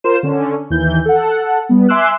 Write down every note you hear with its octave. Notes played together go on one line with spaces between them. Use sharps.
F4 A#4 C5 E7
D3 C#4
D#2 E3 G6
A4 F#5
G3 B3
E5 G#5 C6 D6 E6 F#6